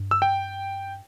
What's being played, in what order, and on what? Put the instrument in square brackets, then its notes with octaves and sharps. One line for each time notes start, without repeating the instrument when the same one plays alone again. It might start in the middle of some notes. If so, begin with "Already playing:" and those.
Already playing: [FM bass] G2
[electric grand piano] E6
G5